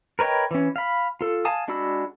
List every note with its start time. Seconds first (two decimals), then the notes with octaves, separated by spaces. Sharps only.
0.19 A#4 B4 C#5 D#5 G5
0.51 E3 C#4
0.76 F5 B5
1.21 F4 A4
1.45 F5 G#5 A5 D#6
1.68 G#3 D4 F#4 B5 E6